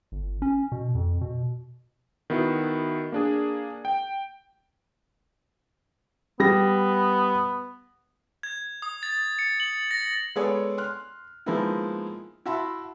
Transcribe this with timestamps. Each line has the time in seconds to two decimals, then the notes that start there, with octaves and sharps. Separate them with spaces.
0.12 G1
0.42 C#4
0.72 B2
0.95 F2
1.21 B2
2.30 D#3 B3 E4 F#4
3.12 A#3 D4 G#4
3.85 G5
6.40 G3 B3 A#6
8.43 G#6
8.82 D#6
9.03 A6
9.39 C#7
9.60 F#7
9.91 A#6
10.36 G#3 B3 G#4 A4 C#5 D5
10.78 C6 F6 F#6
11.46 F3 G#3 A#3 B3 D#4 E4
12.46 E4 F#4 E5 A5 B5 C6